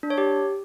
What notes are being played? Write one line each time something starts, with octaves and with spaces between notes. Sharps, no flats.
D4
C#5
G4